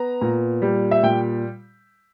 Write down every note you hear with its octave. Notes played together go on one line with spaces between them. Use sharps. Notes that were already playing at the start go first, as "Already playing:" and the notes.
Already playing: B3 A#5
A#2
G3
E5
A#2 G5